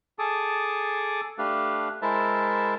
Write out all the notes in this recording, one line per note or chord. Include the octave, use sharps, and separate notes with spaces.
G#4 A4 A5 D6 D#6
A3 D4 G4 B4 F5
G#3 E4 A#4 C5 E5 A5